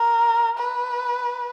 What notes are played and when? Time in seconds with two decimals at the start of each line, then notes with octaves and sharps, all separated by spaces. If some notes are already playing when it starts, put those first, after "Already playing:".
Already playing: A#4
0.58 B4